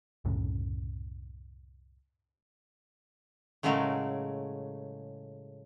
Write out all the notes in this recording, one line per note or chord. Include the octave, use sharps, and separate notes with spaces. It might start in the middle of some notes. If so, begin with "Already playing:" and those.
C2 F#2 A2 C#3
A2 C#3 F#3 G#3 A3 A#4